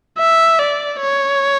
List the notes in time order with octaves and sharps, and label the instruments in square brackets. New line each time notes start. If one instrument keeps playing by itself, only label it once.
[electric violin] E5
D5
C#5